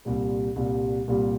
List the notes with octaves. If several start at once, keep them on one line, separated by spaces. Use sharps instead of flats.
C2 A#2 G3
C2 A#2 G3
C2 A#2 G3